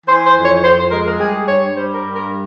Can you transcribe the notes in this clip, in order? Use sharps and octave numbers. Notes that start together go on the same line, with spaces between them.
E3 C5
C5
F2
C#5
F2 C5
C5
G#3 A#4
A#4
G3 G#4
G2 C#5
G3 C5
A#4
G2
A#4